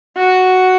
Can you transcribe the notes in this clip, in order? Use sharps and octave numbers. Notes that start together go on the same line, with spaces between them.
F#4